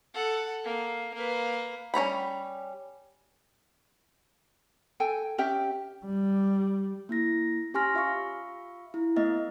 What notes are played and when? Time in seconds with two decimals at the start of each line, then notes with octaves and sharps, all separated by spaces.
0.14 A4 F#5
0.64 A#3
1.14 A#3 B4
1.94 G3 C#4 A#5 B5
5.00 A4 G5 G#5
5.38 C#4 G4 E5 G5
6.05 G3
7.09 A#3 E4 A#6
7.74 C#4 G4 G#5 C6 F6 A#6
7.94 F4 E5 F5 C#6
8.94 E4
9.16 A3 B3 D#5 E5